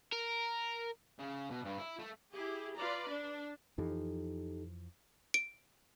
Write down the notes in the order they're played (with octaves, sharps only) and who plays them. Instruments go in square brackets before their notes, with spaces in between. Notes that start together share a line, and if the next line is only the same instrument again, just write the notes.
[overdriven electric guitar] A#4
[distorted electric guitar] C#3
B2
G2
E4
A3
[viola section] E4 G4 G#4
F4 B4 D5 A#5
D4
[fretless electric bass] F2 E3 F3 [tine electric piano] D#4 G4 A4
[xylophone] D7